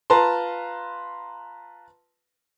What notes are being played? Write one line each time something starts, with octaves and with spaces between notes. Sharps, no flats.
F4 B4 A5 A#5 C6